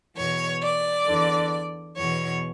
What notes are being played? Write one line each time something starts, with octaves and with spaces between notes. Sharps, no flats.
E2 B2 C#5
D5
E2 D3
E2 B2 C#5